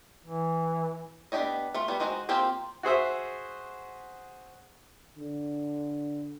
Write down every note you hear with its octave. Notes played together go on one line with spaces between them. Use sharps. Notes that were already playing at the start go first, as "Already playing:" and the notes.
E3
B3 D4 G4 C#5 D#5
A3 F4
G3 B3
G#3 D#4 F#4 C5
A#3 C4 F4 G4 C5
F#4 G#4 C5 E5
D3